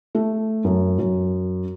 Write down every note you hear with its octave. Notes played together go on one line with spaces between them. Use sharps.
A3
F#2
F#2